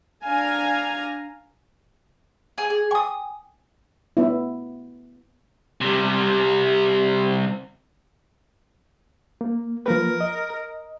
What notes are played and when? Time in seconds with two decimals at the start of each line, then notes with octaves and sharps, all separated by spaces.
0.24 D4 F5 G#5 A#5
2.58 G#4 G#5
2.70 G#4
2.91 G5 G#5 C#6 D#6
4.17 B3 E4
5.81 C3 G3
9.41 A#3
9.86 F3 A#3 A#4 B4
10.21 D#5